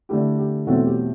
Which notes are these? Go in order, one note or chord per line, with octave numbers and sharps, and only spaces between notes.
D3 A3 E4 G4
G4
E2 B2 F#3 A3 C4 F#4 A4
G4